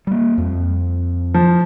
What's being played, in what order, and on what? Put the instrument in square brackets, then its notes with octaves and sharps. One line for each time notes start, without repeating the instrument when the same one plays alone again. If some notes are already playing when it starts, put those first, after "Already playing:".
[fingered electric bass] G3 A#3
F2
[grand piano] F3